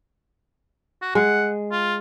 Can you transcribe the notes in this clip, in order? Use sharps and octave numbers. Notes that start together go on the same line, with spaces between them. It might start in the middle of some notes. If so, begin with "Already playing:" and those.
F#4
G#3 F#5
F4